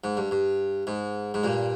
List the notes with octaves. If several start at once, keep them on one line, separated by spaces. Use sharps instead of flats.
G#2
G2
G2
G#2
G#2
G2 A#2